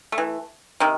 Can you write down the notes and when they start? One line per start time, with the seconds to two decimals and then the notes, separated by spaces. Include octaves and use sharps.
0.12 A3
0.18 E3
0.80 C3 D#3